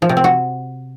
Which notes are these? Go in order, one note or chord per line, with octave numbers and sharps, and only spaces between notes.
F3
C3
C4
F#4